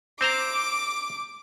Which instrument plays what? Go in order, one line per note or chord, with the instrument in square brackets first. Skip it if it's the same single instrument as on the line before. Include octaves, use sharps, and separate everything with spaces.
[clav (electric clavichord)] C4 C5 A#5 [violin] D6